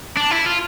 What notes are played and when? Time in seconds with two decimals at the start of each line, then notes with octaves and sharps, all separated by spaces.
0.17 D4
0.31 E4
0.46 F4